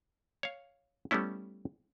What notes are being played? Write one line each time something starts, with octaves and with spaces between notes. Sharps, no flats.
C#5 F5
G3 A3 B3 C#4 E4